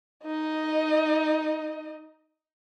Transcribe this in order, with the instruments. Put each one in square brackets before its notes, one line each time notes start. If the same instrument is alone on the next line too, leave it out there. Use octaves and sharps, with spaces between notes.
[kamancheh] D#4 D#5